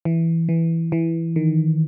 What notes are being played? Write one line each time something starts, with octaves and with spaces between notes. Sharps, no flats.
E3
E3
E3
D#3